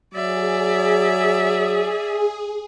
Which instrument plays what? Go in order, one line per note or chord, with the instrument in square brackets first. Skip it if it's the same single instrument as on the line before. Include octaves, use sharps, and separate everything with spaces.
[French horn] F#3 [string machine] G#4 [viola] D5 E5